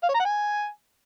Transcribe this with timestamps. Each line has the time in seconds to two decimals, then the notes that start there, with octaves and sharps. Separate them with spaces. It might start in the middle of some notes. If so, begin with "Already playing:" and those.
0.03 F5
0.09 C#5
0.14 A#5
0.20 F#5
0.25 G#5